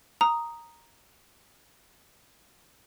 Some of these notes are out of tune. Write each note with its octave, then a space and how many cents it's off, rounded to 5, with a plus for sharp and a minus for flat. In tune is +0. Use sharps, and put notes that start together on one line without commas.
A#5 +0 D#6 +0